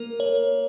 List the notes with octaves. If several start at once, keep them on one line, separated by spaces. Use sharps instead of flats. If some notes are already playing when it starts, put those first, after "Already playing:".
Already playing: A#3 A#4
C#5